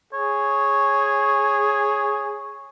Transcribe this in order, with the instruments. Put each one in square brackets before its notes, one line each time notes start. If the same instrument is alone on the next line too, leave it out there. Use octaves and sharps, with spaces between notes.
[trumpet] G#4 [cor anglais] C#5